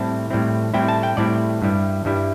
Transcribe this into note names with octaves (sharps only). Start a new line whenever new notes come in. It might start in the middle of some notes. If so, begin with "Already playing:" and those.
Already playing: A2 G3 C4 E4 A5
A2 G3 C4 E4
A2 G3 C4 E4 G5
A5
G5
A2 G3 C4 E4 D5
G2 G3 E4
G2 G3 E4